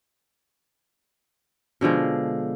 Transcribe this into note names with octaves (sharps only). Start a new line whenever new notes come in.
B2 D3 F3 G#3